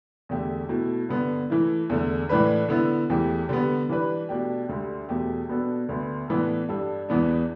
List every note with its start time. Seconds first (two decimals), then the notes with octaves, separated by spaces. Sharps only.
0.29 E2 D3 A3 G4
0.69 B2 A3 E4
1.09 G2 D3 B3
1.50 E3 A3 E4
1.90 E2 D3 A3
2.29 A2 E3 A3 D4 B4
2.69 D3 B3 E4
3.10 E2 E3 A3 G4
3.49 D3 G3 B3
3.89 E3 G3 D4 B4
4.29 B2 A3 D4 G4
4.69 D2 D3 G3
5.09 E2 B2 A3 G4
5.49 B2 B3 D4 A4
5.89 D2 D3 B3
6.28 A2 E3 B3 D4 A4
6.69 G2 G3 D4 A4
7.09 E2 E3 B3 D4